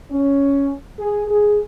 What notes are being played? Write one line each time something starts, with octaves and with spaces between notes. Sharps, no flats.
C#4
G#4
G#4